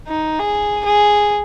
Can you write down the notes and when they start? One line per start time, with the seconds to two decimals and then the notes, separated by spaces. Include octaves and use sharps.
0.08 D#4
0.39 G#4
0.85 G#4